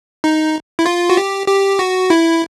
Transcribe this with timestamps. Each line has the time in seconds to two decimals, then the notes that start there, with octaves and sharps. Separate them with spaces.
0.24 D#4
0.79 E4
0.86 F4
1.10 F#4
1.17 G4
1.47 G4
1.79 F#4
2.10 E4